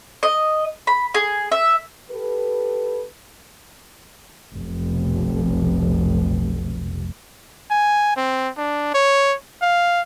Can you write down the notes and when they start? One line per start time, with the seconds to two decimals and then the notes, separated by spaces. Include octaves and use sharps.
0.23 D#5
0.87 B5
1.14 G#4
1.52 E5
2.10 G4 A4 B4
4.54 F1 B1
7.71 G#5
8.16 C4
8.58 D4
8.94 C#5
9.62 F5